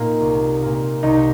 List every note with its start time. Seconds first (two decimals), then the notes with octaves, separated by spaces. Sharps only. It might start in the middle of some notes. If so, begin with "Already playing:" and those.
Already playing: A#2 A#3 D#4
0.21 C2
0.62 A#2 A#3
1.03 C2 D#4